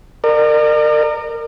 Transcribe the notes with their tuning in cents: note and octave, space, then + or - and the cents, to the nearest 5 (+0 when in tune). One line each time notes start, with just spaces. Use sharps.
A#4 -20 D5 +40